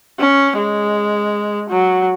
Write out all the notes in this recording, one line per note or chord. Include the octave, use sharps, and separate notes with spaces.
C#4
G#3
F#3